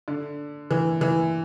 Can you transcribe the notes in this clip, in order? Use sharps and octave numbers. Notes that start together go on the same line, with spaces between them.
D3
E3
E3